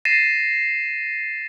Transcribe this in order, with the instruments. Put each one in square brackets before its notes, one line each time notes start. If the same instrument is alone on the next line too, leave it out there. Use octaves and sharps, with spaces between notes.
[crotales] A6 A#6 C7 D#7 E7